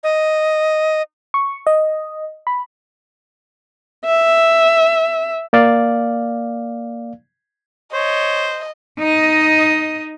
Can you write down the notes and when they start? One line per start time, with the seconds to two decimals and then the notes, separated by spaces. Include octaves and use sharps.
0.03 D#5
1.34 C#6
1.67 D#5
2.47 B5
4.05 E5
5.53 A#3 D5 F5
7.94 C5 C#5 D#5
8.99 D#4 D#5